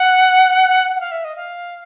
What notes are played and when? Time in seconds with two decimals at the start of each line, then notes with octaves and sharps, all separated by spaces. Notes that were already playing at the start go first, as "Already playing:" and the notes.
Already playing: F#5
0.95 F#5
1.00 F5
1.11 E5
1.24 D#5
1.36 F5